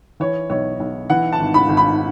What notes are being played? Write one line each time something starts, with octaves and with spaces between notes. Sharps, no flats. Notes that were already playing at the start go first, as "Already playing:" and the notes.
E3 C#5
B1 C#5
B1
E3 F#5
A5
G#1
B5
G#1
B5